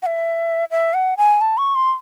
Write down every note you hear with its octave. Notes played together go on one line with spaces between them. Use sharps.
F#5
E5
E5
F#5
G#5
A5
C#6
C6